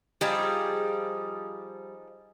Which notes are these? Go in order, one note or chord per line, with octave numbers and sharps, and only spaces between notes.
F3 G3 D#4 G4 G#4